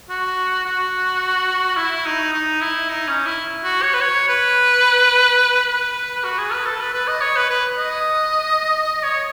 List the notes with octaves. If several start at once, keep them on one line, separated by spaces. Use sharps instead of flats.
F#4
F#4
E4
D#4
D#4
E4
D#4
C#4
E4
F#4
C#5
B4
C#5
B4
B4
F#4
G#4
B4
A4
B4
B4
D#5
C#5
B4
B4
D#5
C#5